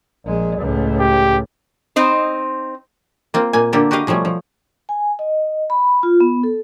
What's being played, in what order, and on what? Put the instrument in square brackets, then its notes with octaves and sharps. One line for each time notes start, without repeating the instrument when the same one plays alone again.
[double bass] A#1 G#3
C#2 A2
[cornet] G4
[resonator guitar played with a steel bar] C4 D#4 C5
[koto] A#3 C4 F4
A#2 A#3 G#5
D3 A#3 G4 A4
F#4 G4 B4 D#5 F5
B2 F3 G3 A3 C#4
F3
[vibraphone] G#5
D#5
B5
F4
B3
A4